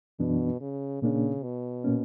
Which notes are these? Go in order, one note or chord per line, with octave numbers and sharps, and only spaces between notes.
F#2 B2 E3 B3 D4
C#3
A#2 C#3 A#3 D4
B2
A#2 A#3 C#4